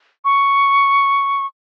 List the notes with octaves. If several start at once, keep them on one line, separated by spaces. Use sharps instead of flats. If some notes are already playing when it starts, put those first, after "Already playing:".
C#6